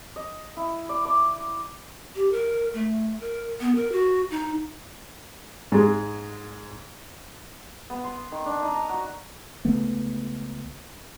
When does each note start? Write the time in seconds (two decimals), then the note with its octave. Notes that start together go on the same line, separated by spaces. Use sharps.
0.16 D#5
0.57 E4
0.89 D5
1.05 D6
2.15 G4
2.32 A#4
2.74 A3
3.21 A#4
3.61 B3
3.76 A#4
3.92 F#4
4.31 D#4
5.72 G#2 G#3
7.90 B3
8.04 C6
8.32 D#3
8.46 D4
8.62 D#4
8.74 A#5
8.89 F#4
9.65 C#2 D3 A3 B3